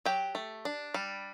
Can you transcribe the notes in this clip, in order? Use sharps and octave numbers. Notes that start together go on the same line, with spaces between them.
F#3 G4 G5
A3
D4
G3